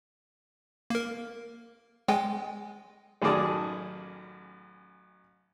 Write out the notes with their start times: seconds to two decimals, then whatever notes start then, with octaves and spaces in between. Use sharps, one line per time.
0.90 A#3 A#4
2.08 G#3 G#4 G5 G#5
3.22 A1 F#2 D#3 G#4 D5 A5